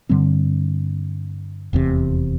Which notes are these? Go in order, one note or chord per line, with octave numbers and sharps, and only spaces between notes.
G2 D3 G3 C4
F1 E2 C3